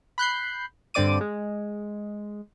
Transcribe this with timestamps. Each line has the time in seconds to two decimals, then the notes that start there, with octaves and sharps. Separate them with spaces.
0.18 B5 F#6 G6 C7
0.94 G2 D3 C4 D5 D6 D#7
1.21 G#3